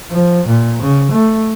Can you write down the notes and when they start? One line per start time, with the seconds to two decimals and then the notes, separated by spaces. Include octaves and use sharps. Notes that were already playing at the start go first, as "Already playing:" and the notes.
0.11 F3
0.47 A#2
0.82 C#3
1.11 A3